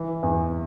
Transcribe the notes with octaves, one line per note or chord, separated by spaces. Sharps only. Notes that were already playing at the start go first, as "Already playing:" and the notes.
Already playing: E3
E2